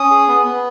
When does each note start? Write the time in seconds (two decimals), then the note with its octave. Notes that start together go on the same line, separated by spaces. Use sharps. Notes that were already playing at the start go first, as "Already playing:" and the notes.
Already playing: C#4 D#6
0.10 G#4
0.28 B3
0.45 B3